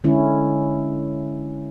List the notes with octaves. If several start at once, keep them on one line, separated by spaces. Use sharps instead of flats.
D3 G#3 C#4 E4